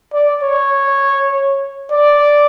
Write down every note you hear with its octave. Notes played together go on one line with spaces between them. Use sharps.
D5
C#5
D5